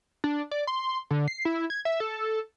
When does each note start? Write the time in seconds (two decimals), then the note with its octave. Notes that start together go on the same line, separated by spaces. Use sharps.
0.24 D4
0.51 D5
0.67 C6
1.10 D3
1.28 C7
1.45 E4
1.70 G#6
1.85 E5
2.00 A4